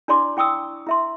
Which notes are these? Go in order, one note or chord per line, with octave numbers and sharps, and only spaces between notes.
D4 E4 D5 C6 D6
E4 G5 C#6 D#6 E6
E4 E5 C6